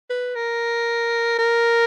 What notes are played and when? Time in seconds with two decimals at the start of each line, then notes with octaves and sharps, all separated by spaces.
0.10 B4
0.35 A#4
1.39 A#4